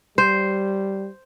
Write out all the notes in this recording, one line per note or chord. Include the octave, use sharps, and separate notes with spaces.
G3 C5